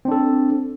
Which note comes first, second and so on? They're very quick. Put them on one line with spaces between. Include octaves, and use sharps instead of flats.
C4 D4 A4